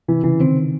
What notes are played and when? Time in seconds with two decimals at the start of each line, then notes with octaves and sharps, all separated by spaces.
0.08 C3 E3
0.24 C#3 E3
0.40 D#3 C4